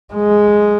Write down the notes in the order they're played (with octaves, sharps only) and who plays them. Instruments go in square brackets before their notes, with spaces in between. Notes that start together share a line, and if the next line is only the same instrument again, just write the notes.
[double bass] G#3